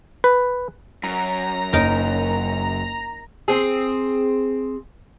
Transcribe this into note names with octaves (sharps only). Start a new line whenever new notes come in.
B4
F#2 A#5
F#1 C#4 D#4 A#4
C4 G#4